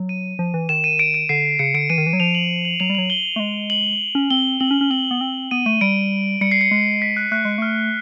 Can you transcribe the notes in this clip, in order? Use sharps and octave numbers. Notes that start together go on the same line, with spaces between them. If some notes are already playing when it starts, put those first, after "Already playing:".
Already playing: F#3
D#7
F3
E3
D#3 E7
D#7
D7
D7
D3 C7
C#3 C#7
D3 D7
E3 D#7
D#3
E3
F#3
F3 F7
F#7
F#7
F#3 F7
G3
F#3 F#7
G7
A3
G#3
F#7
C#4
C4 G7
C4 F#7
C#4
C#4
C4 F#7
B3
C4
B3 D#7
A3 D#7
G3 D7
G3 C#7
C7
C#7
G#3
B6
F#6
A3 F#6
G#3
A3 F6